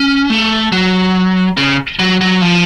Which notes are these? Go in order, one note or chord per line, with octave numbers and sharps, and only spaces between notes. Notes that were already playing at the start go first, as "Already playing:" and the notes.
Already playing: C#4
A3
F#3
C#3
F#3
F#3
F3